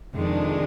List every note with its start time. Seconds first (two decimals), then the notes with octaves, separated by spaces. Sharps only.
0.15 F2 C3 D#3 G#3 D4